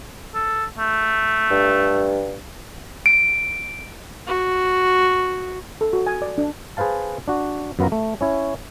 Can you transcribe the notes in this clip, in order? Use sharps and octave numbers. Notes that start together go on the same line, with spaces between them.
A4
A3
G2
D7
F#4
A4
F#4
G#5
D5
D4
G#4 B4 C5 F5 A5
D4 F#4
F#2 B3 F4 A#5
A3
C#4 E4 C#5